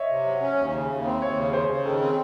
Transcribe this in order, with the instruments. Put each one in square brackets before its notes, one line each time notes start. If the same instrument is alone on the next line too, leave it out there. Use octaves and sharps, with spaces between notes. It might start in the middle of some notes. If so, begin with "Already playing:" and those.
Already playing: [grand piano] C#5 D#5 E5
[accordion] C3
F#3
C#4
D#2
C#3
D#2
C4
[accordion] D#2 [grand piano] C#5
[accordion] C#3
[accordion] C#3 [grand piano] C5
[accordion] C#3
[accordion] D#3 [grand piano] A4
[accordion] C4